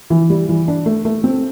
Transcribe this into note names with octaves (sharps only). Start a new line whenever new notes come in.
E3
G3
E3
D4
A3
A3
C4